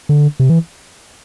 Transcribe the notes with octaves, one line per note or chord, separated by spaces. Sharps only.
D3
C3
E3